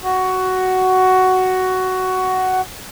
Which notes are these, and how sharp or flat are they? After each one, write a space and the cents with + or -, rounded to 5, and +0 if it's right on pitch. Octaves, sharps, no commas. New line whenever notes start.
F#4 +10